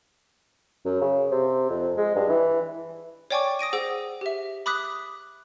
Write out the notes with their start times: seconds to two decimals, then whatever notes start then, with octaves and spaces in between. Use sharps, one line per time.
0.85 F#2
1.01 C#3
1.31 C3
1.70 F2
1.97 G#3
2.15 G2
2.29 E3
3.30 C#5 D5 G5 G#5 C#6 D6
3.59 D#6 A#6 D7 D#7
3.73 G#4 C5 F#5 E6
4.21 G4 E5
4.66 B5 D6 D#6 F#6 B6